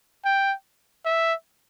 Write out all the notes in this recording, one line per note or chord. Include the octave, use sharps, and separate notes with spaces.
G5
E5